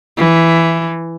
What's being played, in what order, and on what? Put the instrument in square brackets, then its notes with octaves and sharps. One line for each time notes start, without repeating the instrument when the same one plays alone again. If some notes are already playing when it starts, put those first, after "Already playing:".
[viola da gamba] E3